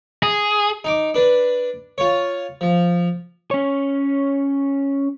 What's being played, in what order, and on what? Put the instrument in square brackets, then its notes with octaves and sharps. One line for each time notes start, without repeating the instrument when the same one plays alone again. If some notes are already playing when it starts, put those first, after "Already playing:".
[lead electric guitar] G#4
[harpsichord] D#4 D6
D4 B4
F4 C#5
F3
[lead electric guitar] C#4 C#5